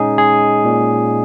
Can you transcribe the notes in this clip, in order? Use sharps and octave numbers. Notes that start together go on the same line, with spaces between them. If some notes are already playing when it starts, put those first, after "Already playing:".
Already playing: A#2 G#3 C#4 D#4 G#4
G#3 G#4
A#2